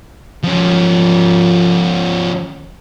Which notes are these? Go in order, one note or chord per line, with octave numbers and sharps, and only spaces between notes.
F3 C#4